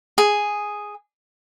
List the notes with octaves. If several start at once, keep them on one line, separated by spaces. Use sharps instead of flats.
G#4